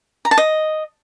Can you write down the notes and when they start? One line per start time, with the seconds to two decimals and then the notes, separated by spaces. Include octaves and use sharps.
0.25 A#5
0.31 A5
0.38 D#5